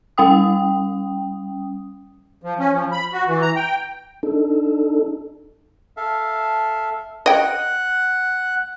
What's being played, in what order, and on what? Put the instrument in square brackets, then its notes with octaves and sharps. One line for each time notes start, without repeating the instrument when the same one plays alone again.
[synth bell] G3 C#4 G5 D#6
[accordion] F3
C#4
F3
B5
F#4
E3
A#5
G5
[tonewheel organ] D4 D#4 A4
[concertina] A4 E5 F5
[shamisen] D#5 G5 [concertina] F#5 F#6